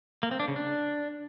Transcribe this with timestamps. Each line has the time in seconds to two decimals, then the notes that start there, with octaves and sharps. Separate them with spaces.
0.23 A#3
0.31 C4
0.40 D4
0.48 C#3
0.56 D4